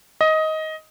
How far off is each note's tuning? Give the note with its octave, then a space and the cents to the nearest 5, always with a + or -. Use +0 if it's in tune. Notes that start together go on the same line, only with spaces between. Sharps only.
D#5 +15